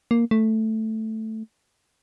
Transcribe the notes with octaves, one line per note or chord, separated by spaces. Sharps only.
A#3
A3